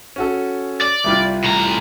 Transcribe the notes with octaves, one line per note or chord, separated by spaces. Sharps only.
C#4 F#4 A4
D5
C2 G3 F4
A2 A#5